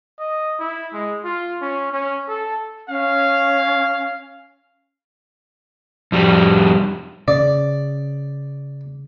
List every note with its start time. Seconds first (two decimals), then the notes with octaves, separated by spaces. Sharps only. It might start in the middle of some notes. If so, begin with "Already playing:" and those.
0.19 D#5
0.59 E4
0.93 G#3
1.24 F4
1.62 C#4
1.92 C#4
2.28 A4
2.89 C#4 F5
6.12 F2 G3
7.28 C#3 D5